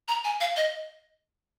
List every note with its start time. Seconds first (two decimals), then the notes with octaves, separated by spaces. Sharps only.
0.08 A#5
0.24 G#5
0.40 F5
0.56 D#5